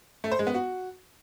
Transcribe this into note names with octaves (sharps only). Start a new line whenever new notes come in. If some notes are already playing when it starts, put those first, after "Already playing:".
A3
C5
G#3
B3
F#4